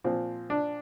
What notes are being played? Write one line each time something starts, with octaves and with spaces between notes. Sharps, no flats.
A#2 F3 C4
D4